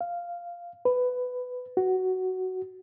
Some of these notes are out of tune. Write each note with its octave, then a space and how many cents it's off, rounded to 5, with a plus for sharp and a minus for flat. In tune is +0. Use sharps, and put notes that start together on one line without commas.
F5 -5
B4 +15
F#4 +10